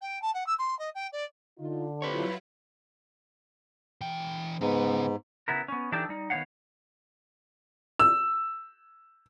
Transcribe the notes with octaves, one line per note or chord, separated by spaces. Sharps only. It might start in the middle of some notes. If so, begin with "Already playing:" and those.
G5
A5
F#5
E6
C6
D#5
G5
D5
D3 D#4 F4
F#3 G3 A3 C4 E4 F4 B4 C#5
E3 G5
G#2 C#3 B3 B4
C#3 B3 E4 A#4
B3 C#4
E3 D4 D#4 G4 A4
G3 D#4
D#3 B3 D4 C#5 F5 F#5
E6